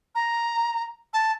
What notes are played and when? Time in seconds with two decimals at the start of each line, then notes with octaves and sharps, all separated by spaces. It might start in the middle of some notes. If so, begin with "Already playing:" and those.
0.15 A#5
1.14 A5